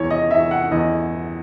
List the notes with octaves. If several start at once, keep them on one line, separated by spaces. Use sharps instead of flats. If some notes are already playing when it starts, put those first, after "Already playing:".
Already playing: E2 C#5
D#5
E2 E5
F#5
E2 D#5